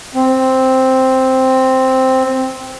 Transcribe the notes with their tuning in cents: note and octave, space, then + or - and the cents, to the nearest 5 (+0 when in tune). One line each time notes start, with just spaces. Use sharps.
C4 +0